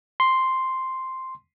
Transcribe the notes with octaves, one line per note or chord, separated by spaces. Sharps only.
C6